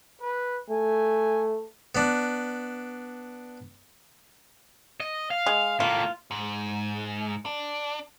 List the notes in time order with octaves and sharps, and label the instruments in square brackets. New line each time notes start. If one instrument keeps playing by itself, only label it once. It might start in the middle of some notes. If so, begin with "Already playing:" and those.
[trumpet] B4
[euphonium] A3 [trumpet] G#5
[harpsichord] B3 D4
[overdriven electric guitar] D#5
F5
[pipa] G#3
[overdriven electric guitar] A2 A#3 [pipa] F4
[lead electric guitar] G#2
D4